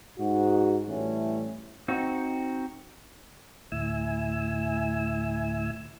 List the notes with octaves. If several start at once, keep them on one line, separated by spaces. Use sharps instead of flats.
G#2 F#4
A2 E3 G3 A3 C#4
C4 D#4 F#4
D2 A2 E4 G#5 E6